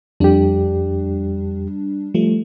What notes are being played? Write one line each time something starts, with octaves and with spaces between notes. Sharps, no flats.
F2 G3 D4 G4
F3 G3 A3